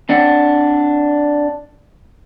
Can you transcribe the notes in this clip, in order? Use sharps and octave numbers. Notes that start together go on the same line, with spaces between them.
C4 D4 F#5